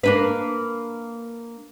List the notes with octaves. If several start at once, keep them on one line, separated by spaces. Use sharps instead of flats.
A#3 D4 B4